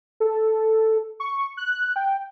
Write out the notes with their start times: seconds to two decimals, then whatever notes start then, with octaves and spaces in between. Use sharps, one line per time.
0.20 A4
1.20 C#6
1.57 F#6
1.96 G5